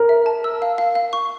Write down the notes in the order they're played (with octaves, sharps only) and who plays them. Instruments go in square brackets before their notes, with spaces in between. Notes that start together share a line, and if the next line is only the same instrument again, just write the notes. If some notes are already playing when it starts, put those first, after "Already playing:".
Already playing: [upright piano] A#4
[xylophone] E5
A5
E6
F5
F5
F5
C#6